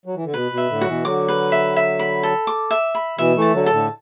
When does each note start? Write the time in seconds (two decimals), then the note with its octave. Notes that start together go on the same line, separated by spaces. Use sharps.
0.06 F#3
0.15 E3
0.25 D3
0.34 B2 B4
0.52 B2
0.57 E5
0.69 A2 D3
0.80 F#3 F#4
0.87 B2 E3
1.05 D3 F#3 D6
1.28 B4
1.52 E5
1.76 E5
1.99 B5
2.23 A4
2.47 D6
2.71 E5
2.95 B5
3.18 B2 E3 E5
3.36 E3 A3
3.42 A5
3.54 D3 F#3
3.66 A4
3.72 A2 D3